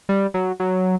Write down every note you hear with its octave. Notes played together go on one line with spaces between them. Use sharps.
G3
F#3
F#3